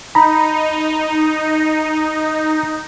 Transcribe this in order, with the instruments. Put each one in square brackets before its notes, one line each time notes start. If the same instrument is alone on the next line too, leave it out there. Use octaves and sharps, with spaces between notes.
[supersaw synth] D#4 [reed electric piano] A#5 B5